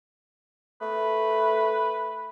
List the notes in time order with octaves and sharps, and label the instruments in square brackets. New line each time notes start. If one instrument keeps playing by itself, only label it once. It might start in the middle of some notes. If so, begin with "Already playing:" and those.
[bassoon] A3 [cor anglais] B4